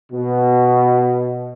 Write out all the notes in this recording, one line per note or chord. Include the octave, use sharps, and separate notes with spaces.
B2